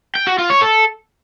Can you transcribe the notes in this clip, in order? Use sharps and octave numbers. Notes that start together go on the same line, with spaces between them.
G5
F#4
F4
C#5
A4